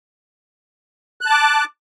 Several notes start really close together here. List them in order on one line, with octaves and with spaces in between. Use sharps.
F#6 A5 D6